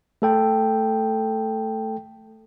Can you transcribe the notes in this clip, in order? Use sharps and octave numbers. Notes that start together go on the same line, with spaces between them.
A3 A4 G5